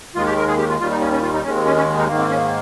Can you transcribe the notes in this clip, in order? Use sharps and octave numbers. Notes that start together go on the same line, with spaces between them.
D#2 D#3 G#3 F4
G4
A#4
G#4
G4
F4
D#2 D#3 G3 F4
D#4
C#4
C#4
F4
D#4
D#2 D#3 G#3 C#4
C4
C#4
C#4
D#4
G#2 D#3 A#3
C4
C#4